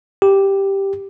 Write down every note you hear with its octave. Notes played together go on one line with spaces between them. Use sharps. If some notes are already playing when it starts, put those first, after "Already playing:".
G4